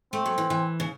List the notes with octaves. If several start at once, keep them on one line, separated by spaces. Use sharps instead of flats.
A3 C4
F#3
E3
E3
C#3